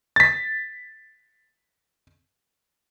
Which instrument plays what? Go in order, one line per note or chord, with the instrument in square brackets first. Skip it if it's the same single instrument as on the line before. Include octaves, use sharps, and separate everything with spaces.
[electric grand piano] A6 B6